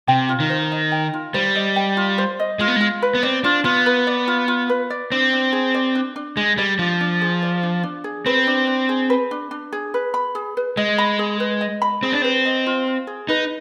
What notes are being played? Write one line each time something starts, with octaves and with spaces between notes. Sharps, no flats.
C3 G5
F4
D#3
C5
D#5
G5
F4
G3 C5
D#5
G5
F4
C5
D#5
G#3 F4
B3
G#3 F4
B4
B3
C4 D5
D4 F4
B3 F4
B4
D5
F4
F4
B4
D5
C4 D4
D4
G#4
D5
D4
D4
G#3 G#4
G3 D5
F3 D4
D4
G#4
D5
D4
D4
G#4
C4 B4
D4
D4
G#4
B4
D4
D4
G#4
B4
B5
G#4
B4
G#3 D#5
B5
G#4
B4
D#5
B5
C4 G#4
D4
C4 B4
D#5
F4
F4
G#4
D#4 B4